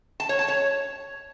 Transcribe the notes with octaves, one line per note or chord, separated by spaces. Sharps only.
A5
C#5
A5
C#5